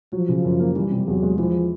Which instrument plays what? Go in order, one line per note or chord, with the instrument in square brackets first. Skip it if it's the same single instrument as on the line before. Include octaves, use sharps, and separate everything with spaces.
[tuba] F3 [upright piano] F#3
[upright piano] C#3
F#2
A#3
[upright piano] E3 [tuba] G3
[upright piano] C3
[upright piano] E2 [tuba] F#3
[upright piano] G#3
[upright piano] E3 [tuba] F3